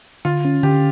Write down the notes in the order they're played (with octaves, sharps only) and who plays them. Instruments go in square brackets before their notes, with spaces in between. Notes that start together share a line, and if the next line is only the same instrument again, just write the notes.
[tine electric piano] D3 [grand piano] F4
[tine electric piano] C#4
[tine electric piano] D3 [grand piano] G4